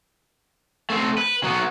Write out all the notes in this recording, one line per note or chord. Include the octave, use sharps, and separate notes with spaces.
A3 C4
B4
F#3 B3